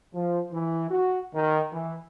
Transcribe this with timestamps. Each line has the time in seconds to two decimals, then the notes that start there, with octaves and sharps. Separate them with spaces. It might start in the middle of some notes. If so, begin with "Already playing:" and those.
0.13 F3
0.52 E3
0.90 F#4
1.34 D#3
1.71 E3